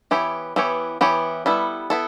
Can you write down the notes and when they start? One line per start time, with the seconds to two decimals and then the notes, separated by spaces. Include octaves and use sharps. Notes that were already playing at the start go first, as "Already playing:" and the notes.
0.11 E3 B3 E4 G4 C#5
0.56 E3 B3 E4 G4 C#5
1.01 E3 B3 E4 G4 C#5
1.46 G3 B3 E4 A4
1.90 B3 E4 A4